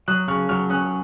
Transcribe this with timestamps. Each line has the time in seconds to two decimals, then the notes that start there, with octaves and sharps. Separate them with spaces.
0.08 F#3 D#6 F#6
0.28 C#3 C#6 F6
0.49 F#3 C#6 F6
0.69 C#4 D#6 F#6